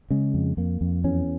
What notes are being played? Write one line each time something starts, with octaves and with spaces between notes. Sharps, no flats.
C#3 G#3
F2
F2 A#3
F2
E2 C#4